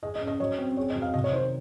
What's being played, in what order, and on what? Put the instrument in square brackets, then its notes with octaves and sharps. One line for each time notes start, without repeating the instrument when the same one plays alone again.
[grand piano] G#4 [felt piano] D#5
[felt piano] D#5
[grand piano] C#4
[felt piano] D#5
[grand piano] F#3 [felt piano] C#5
[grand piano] C4
[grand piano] G#4 [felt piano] C#5
[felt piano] D#5
[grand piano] F#3
[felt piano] F5
[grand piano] C3 [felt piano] D#5
[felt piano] C#5
[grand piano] D#3 [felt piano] C5